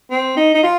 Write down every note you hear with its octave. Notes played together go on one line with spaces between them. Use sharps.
C4
D#4
D#4
F4